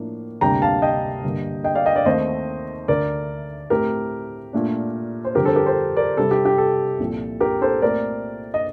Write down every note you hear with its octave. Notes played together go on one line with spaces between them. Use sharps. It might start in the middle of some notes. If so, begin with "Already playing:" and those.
Already playing: A2 F3 A#3 D4
D2 C3 G3 A#3 D4 G5 A#5
F5 A5
D#5 G5
G2 D3 G3 A#3
D#5 G5
D5 F5
D#5 G5
D5 F5
D#2 D#3 A3 C4 C5 D#5
D2 D3 A3 A#4 D5
A2 A3 C4 G4 A#4
A#2 A3 D4
C5
F2 D3 G3 G4 A#4
A4 C5
G4 A#4
A4 C5
A#4 D5
C3 G3 C4 A4
G4
G4
A4
C2 A#2 F3
G4 A#4
A4 C5
A#2 A3 C4 A#4 D5
D#5